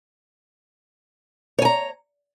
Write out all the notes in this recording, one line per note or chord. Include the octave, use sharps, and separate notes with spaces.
C#5 G#5 A#5